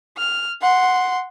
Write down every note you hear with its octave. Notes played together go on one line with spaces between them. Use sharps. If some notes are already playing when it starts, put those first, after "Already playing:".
F6
F#5 C6